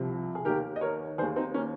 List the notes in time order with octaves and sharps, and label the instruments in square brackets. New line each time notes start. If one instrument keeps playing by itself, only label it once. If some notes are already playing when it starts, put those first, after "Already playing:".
Already playing: [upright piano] C2 C3 F3
G#4
D#2 D#3 G4 A#4
D#5
A#4 C#5
D#3 G#4 C5
D#2
C4 D#4
A#3 C#4